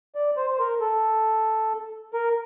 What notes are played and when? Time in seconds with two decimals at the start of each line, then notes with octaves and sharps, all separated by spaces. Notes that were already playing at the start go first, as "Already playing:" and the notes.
0.15 D5
0.37 C5
0.50 C5
0.59 A#4
0.81 A4
2.14 A#4